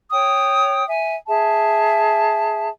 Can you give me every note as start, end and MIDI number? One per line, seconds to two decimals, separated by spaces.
0.11 0.84 73
0.11 0.84 79
0.11 0.84 87
0.88 1.15 76
0.88 1.15 80
1.28 2.68 68
1.28 2.68 76
1.28 2.68 81